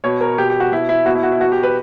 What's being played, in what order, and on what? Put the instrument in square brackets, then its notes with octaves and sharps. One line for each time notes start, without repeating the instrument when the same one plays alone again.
[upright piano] B2 C#5
A#4
B2 G4
G4
F#4
B2 E4
E4
B2 F#4
E4
F#4
E4
B2 F#4
G4
B4